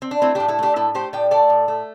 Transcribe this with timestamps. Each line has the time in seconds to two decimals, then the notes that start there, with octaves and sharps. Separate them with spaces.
0.02 C4
0.11 D4
0.22 A3 C4 E4
0.35 A2 D4 G4
0.48 E4 A4
0.59 A3 D4 G4
0.76 A2 E4 A4
0.94 A3 G4 C5
1.13 A2 D5 G5
1.31 A3 A4 D5
1.50 A2
1.68 A3